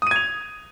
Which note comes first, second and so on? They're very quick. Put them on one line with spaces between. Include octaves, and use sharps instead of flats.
D#6 D#7 G#6 F7